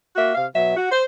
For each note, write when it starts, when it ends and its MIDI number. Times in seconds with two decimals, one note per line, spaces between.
0.16 0.34 58
0.16 0.34 66
0.16 0.34 76
0.34 0.46 48
0.34 0.46 77
0.54 0.73 47
0.54 0.73 54
0.54 0.73 76
0.76 0.89 66
0.90 1.02 72